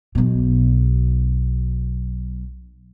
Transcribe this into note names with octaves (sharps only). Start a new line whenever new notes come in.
B1 B2